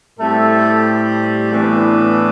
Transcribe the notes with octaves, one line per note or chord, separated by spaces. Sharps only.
A2 G3 A3 C4 A4
A2 E3 B3 D4